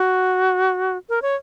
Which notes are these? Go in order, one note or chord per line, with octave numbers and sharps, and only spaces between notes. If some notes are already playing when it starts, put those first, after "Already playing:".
Already playing: F#4
A#4
C#5